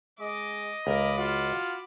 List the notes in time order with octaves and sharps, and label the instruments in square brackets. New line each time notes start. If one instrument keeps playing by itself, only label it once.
[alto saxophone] G#3 [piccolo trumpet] D#5 [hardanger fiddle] D6
[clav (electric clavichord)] C#2 [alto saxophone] A#4 [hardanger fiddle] B5 D6
[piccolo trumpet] F4 [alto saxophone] F#4